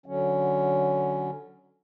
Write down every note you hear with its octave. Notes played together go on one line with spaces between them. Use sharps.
D3 F#3 C#4